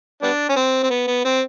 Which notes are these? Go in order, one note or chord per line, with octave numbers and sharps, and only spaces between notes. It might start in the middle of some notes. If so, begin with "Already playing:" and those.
G3 B3 D4
C#4
C4
C4
B3
B3
C4